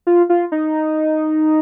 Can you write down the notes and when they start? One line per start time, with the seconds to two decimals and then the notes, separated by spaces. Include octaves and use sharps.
0.07 F4
0.29 F4
0.52 D#4